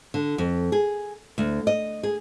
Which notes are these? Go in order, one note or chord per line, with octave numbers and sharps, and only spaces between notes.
D3
F2
G#4
D2
D#5
G#4